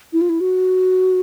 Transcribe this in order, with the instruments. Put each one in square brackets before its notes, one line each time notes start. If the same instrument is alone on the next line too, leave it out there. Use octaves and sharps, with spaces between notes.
[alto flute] E4
F4
E4
F#4